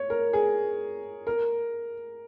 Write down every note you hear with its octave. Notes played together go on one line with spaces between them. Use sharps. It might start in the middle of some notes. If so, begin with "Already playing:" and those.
Already playing: C#5
A#4
G#4
A#4